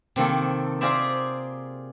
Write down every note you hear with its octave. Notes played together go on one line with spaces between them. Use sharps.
C3 D#3 A#3 A4
F4 G#4 A#4 C5 D5 E5